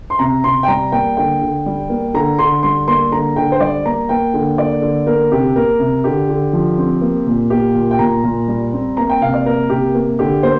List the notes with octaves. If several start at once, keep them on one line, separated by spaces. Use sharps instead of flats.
C6
C3 A#5
C3 C6
G5
G3 A#5
A#3 G5
D3 G5
D3
G3
A#3
D3 A#5
D3 C6
G3 C6
A#3 C6
D3 A#5
D3 G5
C5
G3 D5
A#3 A#5
A#3 G5
D3
A#3 D5
D3
A#3 A#4
C3 G4
A#3 A#4
C3
D3 G4
D3
F3
C4
A#3
A#2
A#3 G4
A#2
G5
A#2 A#5
A#2
G3
C4
A#3 A#5
G5
C3 F5
D5
A#3 A#4
C3 G4
A#3
D3 G4
A#3 C5